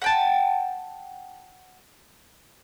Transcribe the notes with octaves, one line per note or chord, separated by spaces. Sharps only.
F#5 G5 A5